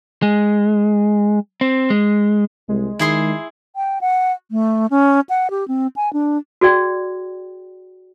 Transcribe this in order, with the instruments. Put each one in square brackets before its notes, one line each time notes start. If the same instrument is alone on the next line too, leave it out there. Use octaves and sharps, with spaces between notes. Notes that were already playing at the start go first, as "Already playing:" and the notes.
[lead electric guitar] G#3
C4
G#3
[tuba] C2 [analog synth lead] G#3
[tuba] D#3 [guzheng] E4 G#4 C6
[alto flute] G5
F#5
A3
C#4
F#5
G4
C4
G#5
D4
[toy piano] F#4 G#4 D5 G5